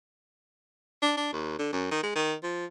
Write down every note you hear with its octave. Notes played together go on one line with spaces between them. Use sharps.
D4
D4
D#2
D3
F#2
D#3
G#3
D#3
F3